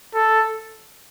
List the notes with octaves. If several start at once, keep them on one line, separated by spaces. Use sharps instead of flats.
A4